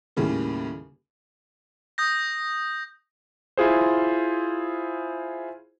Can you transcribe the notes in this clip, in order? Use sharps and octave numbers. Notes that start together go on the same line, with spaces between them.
D#2 A2 C#3 G3 A#3
D#6 G6 A#6
E4 F4 G#4 C5